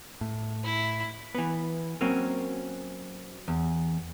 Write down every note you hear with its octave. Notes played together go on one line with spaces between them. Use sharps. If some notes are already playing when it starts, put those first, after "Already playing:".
A2
E4
E3 B3
F#3 A#3 C4 C#4
E2